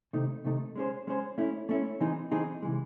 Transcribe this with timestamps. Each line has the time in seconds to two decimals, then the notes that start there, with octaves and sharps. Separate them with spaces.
0.13 C3 D#3 A3 D#4
0.45 C3 D#3 A3 D#4
0.76 G#3 C#4 G#4 C5
1.07 G#3 C#4 G#4 C5
1.38 A3 C#4 E4
1.69 A3 C#4 E4
2.01 E3 C4 D#4 G#4
2.31 E3 C4 D#4 G#4
2.62 C3 E3 G#3